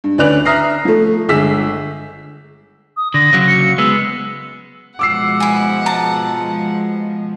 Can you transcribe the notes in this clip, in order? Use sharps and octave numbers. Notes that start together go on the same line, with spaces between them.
G2
D2 C#4 B4 D5 F#6 F7
E5 A#5 D#6 F6 A#6 C7
F3 A3
G1 G#3 G#4 E6 B6
D#6
D3 A#6
C#3 F#3
C#7
G#3 B3 E6
B2 F3 G#3 F#5 D6 E6 C7
E4 G#5
A5 A#5